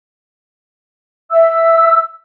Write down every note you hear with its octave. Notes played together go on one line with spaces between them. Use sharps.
E5 E6